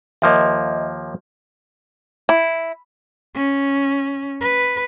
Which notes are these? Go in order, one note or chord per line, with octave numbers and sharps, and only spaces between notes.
D#2 F3 A#3 D#5 E5
E4
C#4
B4